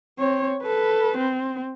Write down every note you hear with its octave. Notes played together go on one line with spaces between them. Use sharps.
C4 C#5
A4 B4
C4